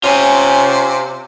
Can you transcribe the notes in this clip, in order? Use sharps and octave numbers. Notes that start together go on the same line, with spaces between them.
C3 C#4 F4 G#5